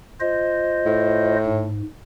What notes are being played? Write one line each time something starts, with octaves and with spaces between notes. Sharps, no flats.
F4 C5 D#5
A2
G#2